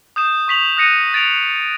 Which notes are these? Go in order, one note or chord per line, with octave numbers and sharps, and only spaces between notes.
D#6 G6 E7
C#6 B6 F7 F#7
D#6 F#6 A#6 C#7 D#7
A6 D7 F7